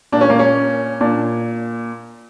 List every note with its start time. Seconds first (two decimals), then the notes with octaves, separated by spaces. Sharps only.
0.12 A#2 D4
0.21 C#4
0.30 A#3
0.39 C#4
1.01 A#2 D4